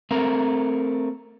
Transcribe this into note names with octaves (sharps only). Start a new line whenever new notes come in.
A3 C4 A#4